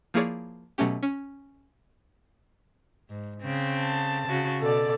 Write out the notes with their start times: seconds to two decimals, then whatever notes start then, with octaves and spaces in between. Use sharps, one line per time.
0.14 F3 A#3 E4 G#4 C#5 D5
0.78 B2 F#3 A3 C#4 G4
1.03 C#4
3.10 G#2
3.41 C#3 C4
3.80 A5
4.28 C#3 F#4
4.61 B2 A4 D5